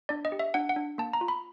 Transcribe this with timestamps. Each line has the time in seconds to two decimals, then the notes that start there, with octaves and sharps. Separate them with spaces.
0.09 D4 D5
0.25 D#5
0.32 G4
0.39 E5
0.54 D4 F#5
0.69 F#5
0.76 D4
0.98 A#3 A5
1.13 A#5
1.21 F4
1.28 B5